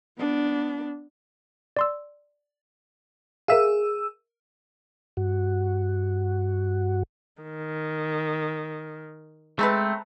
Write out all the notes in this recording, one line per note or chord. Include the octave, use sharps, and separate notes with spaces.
B3 D4
D5 C6 E6
G#4 A#4 E5 F5 E6
G2 F#4
D#3
G#3 A3 C4 B4 A5 A#5